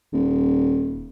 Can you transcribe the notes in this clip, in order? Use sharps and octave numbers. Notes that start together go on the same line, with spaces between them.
D#1